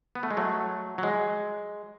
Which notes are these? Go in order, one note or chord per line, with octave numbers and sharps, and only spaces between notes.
B3
A3
G#3
F#3 A3
F#3
G#3